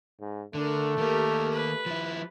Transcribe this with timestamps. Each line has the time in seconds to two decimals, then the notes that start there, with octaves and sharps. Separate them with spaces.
0.21 G#2
0.54 D3 A3 D4 A#4
0.98 D#3 A#3 G4 A#4
1.53 B4
1.86 F3 E4